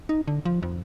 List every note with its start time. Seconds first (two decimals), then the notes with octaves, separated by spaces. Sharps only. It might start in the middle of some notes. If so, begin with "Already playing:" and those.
0.09 D#4
0.28 D3
0.45 F3
0.63 F2